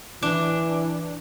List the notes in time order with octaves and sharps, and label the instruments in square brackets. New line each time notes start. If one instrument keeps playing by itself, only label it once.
[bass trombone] E3 [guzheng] D4